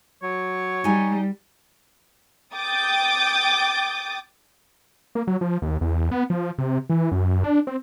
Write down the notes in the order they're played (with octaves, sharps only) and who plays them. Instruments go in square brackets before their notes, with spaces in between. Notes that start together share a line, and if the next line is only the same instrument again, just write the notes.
[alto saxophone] F#3 [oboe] C#5
[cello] G3 [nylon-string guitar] D#4 G#5
[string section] G5 D6 D#6 G6 A6
[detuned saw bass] A#3
F#3
F3
D#2
E2
B3
F3
C3
E3
F#2
D4
C4